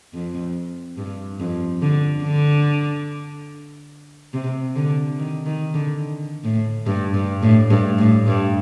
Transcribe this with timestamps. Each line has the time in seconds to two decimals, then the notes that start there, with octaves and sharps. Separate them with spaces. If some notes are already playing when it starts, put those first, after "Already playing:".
0.13 F2
0.98 G2
1.40 F2
1.82 D3
2.23 D3
4.34 C3
4.75 D3
5.19 D#3
5.46 D#3
5.74 D3
6.44 A2
6.87 G2
7.14 G2
7.42 A2
7.70 G2
7.99 A2
8.26 G2